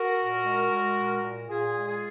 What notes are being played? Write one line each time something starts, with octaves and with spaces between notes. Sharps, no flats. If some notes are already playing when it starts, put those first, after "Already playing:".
Already playing: F#4 A#4
A#2
G#3
G#3
A#2
A#2
A#2 F4 G#4
G#3
F4 G#4